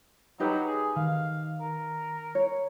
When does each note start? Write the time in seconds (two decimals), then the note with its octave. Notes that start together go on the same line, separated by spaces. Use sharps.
0.40 F#3 D#4 G4 B4
0.66 G#4
0.96 D#3 F5
1.60 A#4
2.35 C#5